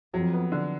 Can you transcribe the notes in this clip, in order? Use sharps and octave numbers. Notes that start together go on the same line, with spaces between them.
F2 F#3
B3
D3